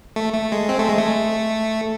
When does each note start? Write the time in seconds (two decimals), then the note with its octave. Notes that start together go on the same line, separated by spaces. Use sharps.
0.16 A3
0.33 A3
0.52 G#3
0.69 C4
0.79 A3
0.89 G#3
0.98 A3